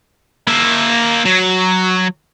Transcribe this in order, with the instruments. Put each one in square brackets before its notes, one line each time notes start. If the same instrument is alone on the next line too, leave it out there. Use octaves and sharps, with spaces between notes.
[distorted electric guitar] A#3 E5
F#3